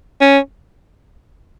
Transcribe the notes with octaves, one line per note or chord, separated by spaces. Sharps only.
C#4